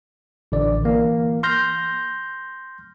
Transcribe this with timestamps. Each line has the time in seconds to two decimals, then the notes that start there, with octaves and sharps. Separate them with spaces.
0.52 A1 D3 D5
0.84 E3 A#3
1.43 C6 F6 G6 A#6